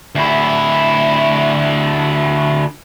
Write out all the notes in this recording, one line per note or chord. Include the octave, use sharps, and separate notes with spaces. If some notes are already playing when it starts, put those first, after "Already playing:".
D2 E4